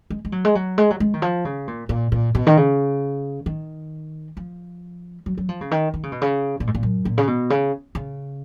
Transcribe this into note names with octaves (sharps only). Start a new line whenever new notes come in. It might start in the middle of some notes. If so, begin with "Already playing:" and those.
G#3
G#3
F#3
G#3
F#3
G#3
F#3
G#3
D#3
F3
C#3
A#2
A#2
A#2
B2
D#3
C#3
D#3
F3
F#3
F#3
F3
C#3
D#3
D#3
C#3
B2
C#3
A#2
G#2
A#2
F#2
A#2
C#3
B2
C#3
C#3